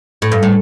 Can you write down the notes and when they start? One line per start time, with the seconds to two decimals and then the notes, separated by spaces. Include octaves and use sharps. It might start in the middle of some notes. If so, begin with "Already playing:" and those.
0.22 A2
0.32 G2
0.43 A2